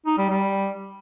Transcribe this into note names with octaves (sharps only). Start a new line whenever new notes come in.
D#4
G3
G3